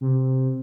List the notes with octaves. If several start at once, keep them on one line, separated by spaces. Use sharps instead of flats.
C3